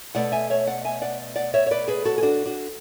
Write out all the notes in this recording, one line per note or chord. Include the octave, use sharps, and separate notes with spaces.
B2 A3 D5 F#5
E5 G#5
C#5 E5
D5 F#5
E5 G#5
D5 F#5
D5 F#5
C#5 E5
C#5
B4 D5
G#4 B4
F#4 A4
G#4
D4 F#4
D4 F#4